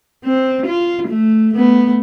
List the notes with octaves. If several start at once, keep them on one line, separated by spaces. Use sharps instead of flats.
C4
F4
A3
A3 B3